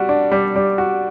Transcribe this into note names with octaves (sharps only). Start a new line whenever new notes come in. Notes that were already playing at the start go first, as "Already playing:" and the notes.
Already playing: G3 F#4
D4
G3
G3
F#4